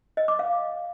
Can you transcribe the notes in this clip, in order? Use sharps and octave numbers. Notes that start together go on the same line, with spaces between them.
D#5
D6
F5